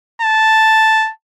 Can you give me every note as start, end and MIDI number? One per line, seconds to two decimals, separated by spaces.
0.22 1.11 81